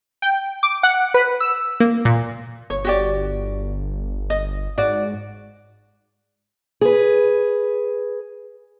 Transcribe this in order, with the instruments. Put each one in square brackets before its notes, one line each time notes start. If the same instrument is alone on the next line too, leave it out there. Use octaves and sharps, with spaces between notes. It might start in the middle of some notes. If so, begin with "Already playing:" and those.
[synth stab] G5
D6
F#5
B4
E6
A#3
A#2
[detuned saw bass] G1 [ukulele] C#5
[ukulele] F#4 G4 D5
D#5
[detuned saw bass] G#2 [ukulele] F#4 D5
[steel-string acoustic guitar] G#4 B4